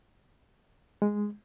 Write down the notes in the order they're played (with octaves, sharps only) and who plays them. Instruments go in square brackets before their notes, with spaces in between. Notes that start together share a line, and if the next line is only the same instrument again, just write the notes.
[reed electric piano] G#3